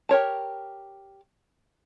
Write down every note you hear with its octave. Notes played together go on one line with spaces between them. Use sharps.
G4 A#4 C#5 A5